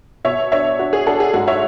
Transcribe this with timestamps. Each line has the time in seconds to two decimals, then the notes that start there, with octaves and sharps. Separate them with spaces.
0.25 B2 C#5 E5
0.52 D4 C#5 E5
0.79 D4 F#4
0.93 G#4
1.07 D4 F#4 A4
1.20 G#4
1.34 G#2 F#4
1.48 C#5 E5